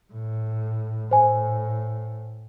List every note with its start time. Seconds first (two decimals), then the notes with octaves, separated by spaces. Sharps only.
0.13 A2
1.11 A2 C5 G#5